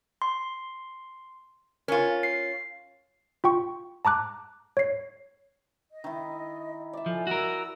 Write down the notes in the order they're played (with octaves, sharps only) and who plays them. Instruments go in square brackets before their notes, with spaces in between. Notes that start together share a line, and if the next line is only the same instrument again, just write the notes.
[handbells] C6
[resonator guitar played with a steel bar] C#4 F4 [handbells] A#4
[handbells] C7
F4 G5 C#6
A5 A#5 D6 F#6
C#5 C7
[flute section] D#5
[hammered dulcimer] D#3 E4
D5 E5
[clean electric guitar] F3 [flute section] A4 G#5
[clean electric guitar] F#4 A#4 [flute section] E6